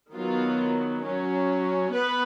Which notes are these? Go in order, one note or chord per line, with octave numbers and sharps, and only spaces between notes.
D#3 F#3 B3 F4
F#3 C#4
B3 B4